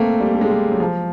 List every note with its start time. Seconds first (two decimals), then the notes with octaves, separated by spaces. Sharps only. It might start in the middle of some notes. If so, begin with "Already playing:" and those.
Already playing: A3 A#3 C4
0.20 G3
0.34 A3
0.41 G#3
0.50 G3
0.72 F#3
0.80 F3